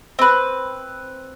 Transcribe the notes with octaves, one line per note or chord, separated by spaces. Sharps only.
C4 B4